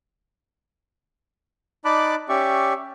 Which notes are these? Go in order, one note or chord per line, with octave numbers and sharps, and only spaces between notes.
D#4 D5 A5 B5 D6 F#6
C#4 G4 D5 E5 C#6